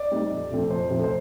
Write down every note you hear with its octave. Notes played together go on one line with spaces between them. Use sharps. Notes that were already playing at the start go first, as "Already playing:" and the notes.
Already playing: D5
G3 C4 D#4
F2
C3 F3 A3 C4
F2 C5
C3 F3 A3 C4
C5